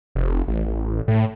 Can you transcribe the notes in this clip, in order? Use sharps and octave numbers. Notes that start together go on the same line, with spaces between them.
F1
A1
A2